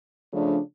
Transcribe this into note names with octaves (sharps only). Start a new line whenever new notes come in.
C#3 F3 A3 D4